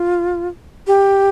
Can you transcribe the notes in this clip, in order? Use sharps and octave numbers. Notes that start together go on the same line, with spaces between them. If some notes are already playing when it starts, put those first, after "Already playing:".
Already playing: F4
G4